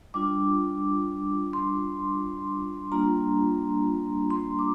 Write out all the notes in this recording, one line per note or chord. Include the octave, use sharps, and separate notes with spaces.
G3 D4 F4 D6
C6
G3 A#3 D4 F4 A#5
C6
D6